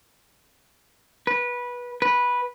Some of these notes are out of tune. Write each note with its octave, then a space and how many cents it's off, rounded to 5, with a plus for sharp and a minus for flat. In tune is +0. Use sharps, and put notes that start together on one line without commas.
B4 -20
B4 -10